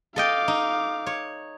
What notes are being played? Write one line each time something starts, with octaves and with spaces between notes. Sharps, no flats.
A4 D#5 F5 G5 D6
D#4
C#5